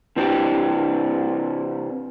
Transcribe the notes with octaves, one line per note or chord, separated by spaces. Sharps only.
C3 E3 C4 D4 G4